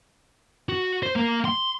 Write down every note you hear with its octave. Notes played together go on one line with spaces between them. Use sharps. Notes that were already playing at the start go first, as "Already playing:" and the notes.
F#4
C5
A#3
C6